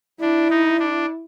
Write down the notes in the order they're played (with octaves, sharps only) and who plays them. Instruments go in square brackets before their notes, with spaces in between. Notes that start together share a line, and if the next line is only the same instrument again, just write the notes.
[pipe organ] D4 [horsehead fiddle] E4
[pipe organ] D#4
D4